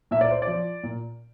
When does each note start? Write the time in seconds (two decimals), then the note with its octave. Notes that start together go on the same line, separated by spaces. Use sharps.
0.11 A#2 E5
0.21 D5
0.31 C5
0.42 F3 D5
0.83 A#2